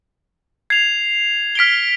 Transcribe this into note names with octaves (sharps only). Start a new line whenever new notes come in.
G#6 C7 F7
F6 B6 D7 G7